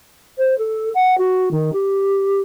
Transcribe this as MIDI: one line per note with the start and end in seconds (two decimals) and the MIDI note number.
0.37 0.56 72
0.58 0.89 69
0.94 1.14 78
1.17 1.48 66
1.51 1.70 51
1.72 2.42 67